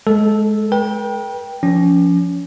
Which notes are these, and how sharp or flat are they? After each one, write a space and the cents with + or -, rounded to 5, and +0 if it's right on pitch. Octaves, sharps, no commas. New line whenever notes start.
G#3 +25 A4 -10
B4 -45 G5 +0
F3 +0 C#4 +30